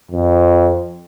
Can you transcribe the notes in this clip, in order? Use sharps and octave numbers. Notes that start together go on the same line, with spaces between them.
F2